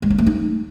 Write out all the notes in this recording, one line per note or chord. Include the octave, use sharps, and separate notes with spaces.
G#3
C#4
A3
D#4